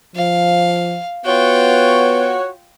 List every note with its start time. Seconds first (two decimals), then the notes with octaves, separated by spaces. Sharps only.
0.16 F3 F5
1.26 B3 F4 F#4 C#5 G5